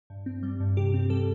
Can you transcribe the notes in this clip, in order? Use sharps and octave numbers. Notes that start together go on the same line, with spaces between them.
G2
C4
G3
G2
C3 G4
C4
G3 A4